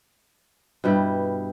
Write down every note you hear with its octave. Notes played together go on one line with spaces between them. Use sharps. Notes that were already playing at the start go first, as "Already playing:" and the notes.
G2 B2 G3 E4